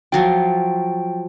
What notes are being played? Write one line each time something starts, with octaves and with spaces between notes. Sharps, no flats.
F3 F#3 F4 G5